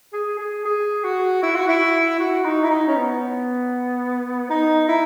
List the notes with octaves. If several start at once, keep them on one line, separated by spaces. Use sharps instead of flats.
G#4
G#4
G#4
F#4
E4
F#4
E4
F#4
D#4
E4
D#4
C#4
B3
D#4
E4